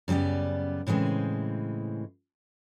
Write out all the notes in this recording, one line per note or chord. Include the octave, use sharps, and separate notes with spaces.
F#2 C#3 G3 B3 D5
A2 C#3 E3 G#3 C4